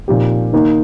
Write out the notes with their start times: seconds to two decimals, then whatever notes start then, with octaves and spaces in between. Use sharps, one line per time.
0.08 A#2 F3 C4 D#4 G4
0.53 D#3 A#3 D#4